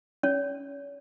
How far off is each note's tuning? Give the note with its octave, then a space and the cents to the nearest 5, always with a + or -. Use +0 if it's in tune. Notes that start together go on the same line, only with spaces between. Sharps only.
C#4 +0 C#5 +40